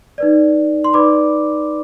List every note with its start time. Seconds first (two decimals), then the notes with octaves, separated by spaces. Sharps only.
0.18 D#4 B4 D5
0.84 C6
0.93 D#4 B4 D5 B5 D6